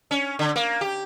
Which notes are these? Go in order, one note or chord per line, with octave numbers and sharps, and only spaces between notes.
C#4
D3
A#3
G4